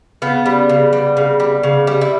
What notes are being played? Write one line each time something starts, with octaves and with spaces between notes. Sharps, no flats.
C#3 B3
G3
C#3
G3
C#3
G3
C#3
G3
E4